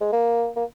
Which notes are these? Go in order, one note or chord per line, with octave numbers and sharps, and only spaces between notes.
G#3
A#3
A#3